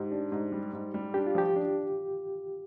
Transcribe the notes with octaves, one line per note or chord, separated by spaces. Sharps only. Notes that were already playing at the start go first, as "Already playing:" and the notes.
Already playing: G#2 G4
D4
G#2
G3
G#2
G3
D4 G4
F4
F3 G4
D4